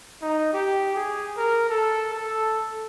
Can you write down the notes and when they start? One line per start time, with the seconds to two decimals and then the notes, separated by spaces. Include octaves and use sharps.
0.22 D#4
0.53 G4
0.95 G#4
1.37 A#4
1.69 A4
2.14 A4